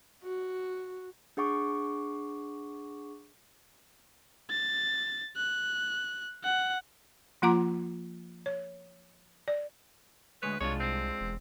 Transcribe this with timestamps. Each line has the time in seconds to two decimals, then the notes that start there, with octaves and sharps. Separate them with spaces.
0.23 F#4
1.37 D4 G#4 F#5 C#6 D6
4.50 A6
5.36 F#6
6.44 F#5
7.42 F3 A#3 F4 F#5 A#5 D6
8.46 C#5
9.48 D5
10.43 D2 G#3 B4 C#5
10.61 C2 G#3 D4 F4 C#5
10.80 C4
11.20 E1